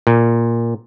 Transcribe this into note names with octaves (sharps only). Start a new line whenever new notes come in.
A#2